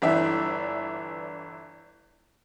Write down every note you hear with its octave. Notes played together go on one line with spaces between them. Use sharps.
G1 E3 D4 E5